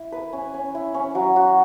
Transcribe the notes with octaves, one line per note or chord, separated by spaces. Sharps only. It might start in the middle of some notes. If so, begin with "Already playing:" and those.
Already playing: E4
B4
C#4
C#4
E4
C#4
F#3
F#4